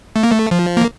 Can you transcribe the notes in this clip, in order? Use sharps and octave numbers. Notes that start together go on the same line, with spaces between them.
A3
A#3
A3
F3
A#3